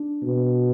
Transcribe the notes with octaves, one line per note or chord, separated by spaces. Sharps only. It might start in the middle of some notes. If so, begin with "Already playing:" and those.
Already playing: D4
B2